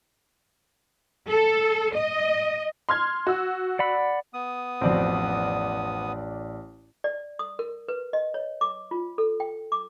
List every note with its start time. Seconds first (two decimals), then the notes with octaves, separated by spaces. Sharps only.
1.28 A4
1.94 D#5
2.89 C6 F6 G#6
3.27 F#4 E6
3.79 D5 F#5 B5
4.34 B3 D#6
4.81 A1 F2 B2 C4 D5
7.04 D5
7.39 D#6
7.59 A#4
7.88 B4
8.13 D#5
8.34 C#5
8.61 D6
8.91 F4
9.18 A4
9.40 G5
9.72 D6